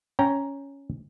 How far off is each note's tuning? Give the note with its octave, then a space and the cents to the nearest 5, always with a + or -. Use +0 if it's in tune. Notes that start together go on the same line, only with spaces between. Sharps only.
C#4 +0 G5 +0 A#5 +0